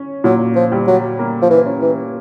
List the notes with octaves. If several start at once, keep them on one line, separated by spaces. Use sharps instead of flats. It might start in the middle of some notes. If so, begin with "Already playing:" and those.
Already playing: C#4
A#2 F#3
F3
G3
F#3
A#3
F3
E3
C#4
E3